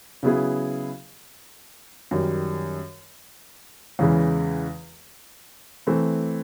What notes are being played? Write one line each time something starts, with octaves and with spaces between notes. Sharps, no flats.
C#3 F#3 B3 E4 G#4
F#2 D#3 G3
E2 C#3 E3 G#3
E3 A3 C4